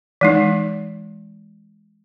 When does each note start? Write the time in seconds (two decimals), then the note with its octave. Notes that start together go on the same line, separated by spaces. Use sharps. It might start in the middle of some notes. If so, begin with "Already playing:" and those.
0.21 E3 G#3 D#4